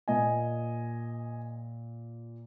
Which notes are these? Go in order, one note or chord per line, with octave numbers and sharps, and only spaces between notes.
A#2 A#3 D#5 G#5